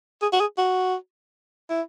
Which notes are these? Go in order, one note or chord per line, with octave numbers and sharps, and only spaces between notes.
G#4
F#4
G#4
F#4
E4